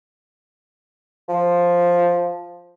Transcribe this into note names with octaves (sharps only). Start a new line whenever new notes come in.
F3